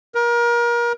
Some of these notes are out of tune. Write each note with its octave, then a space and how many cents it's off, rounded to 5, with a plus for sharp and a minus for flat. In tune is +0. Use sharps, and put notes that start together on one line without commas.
A#4 +30